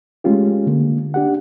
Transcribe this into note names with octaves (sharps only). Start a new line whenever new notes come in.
G#3 A3 C#4 F4 G4
D3 A#3
D4 G4 F#5